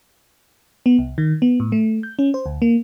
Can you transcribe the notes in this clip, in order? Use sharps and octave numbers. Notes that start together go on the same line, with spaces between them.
B3
C2
D#3
B3
A2
A3
G6
C#4
C5
D2
A#3